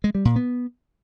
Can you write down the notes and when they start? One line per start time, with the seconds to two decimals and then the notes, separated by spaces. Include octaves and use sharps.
0.04 G#3
0.15 G3
0.25 A#2
0.36 B3